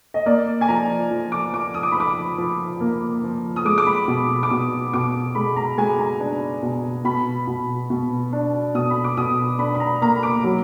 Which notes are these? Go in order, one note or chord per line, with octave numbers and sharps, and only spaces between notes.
D#5
A#3 D5
G#5
F3 A#5
F3
D6
F3 D6
D#6
D6
B5
F3 D6
F3
A#3
F3
D#6
G#3 D6
D6
B5
B2
D6
B2 D#6
B2 D6
G#3 B5
A#5
G#3 G#5
A#5
D4
B2
B2 B5
B2
B2
D4
B2 D#6
B5
D6
B2 D#6
D4 B5
B5
A#5
A#3 A#5
B5
D6
F#3